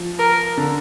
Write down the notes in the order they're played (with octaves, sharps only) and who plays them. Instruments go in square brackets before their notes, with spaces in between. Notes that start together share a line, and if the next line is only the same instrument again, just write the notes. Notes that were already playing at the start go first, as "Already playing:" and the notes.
Already playing: [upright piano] F3
[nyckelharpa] A#4
[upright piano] D3